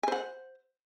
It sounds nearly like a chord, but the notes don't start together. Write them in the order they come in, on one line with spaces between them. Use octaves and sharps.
G#5 C5 F#5